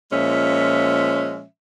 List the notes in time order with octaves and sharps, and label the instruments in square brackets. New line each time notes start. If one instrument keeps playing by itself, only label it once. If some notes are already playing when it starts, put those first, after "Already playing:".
[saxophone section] A#2 F3 G#3 C#4 E5